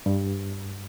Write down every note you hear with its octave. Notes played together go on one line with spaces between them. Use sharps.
G2